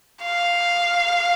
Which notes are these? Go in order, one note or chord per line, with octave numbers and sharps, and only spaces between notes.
F5